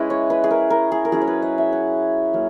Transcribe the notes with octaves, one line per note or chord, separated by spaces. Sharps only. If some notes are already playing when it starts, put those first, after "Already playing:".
Already playing: G#3 C#4 E4 B4 D#5
C#5
B4
G#4
A#4
A#4
G#4
A#4
F#3 C#4 E4 G#4
C#5
B4
D#5
E5
F#5
F#3 A#3 C#4